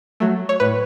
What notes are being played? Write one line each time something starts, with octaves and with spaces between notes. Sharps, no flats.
F#3 A3
C#5
A2 B4